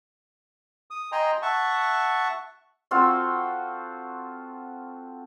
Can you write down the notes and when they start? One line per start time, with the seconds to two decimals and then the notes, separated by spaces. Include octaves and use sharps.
0.91 D#6
1.12 D#5 G5 G#5 A#5 C6
1.42 E5 F#5 A5 C#6
2.91 C4 F4 F#4 A4